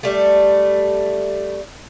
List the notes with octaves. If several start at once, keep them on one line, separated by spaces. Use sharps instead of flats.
G3 A3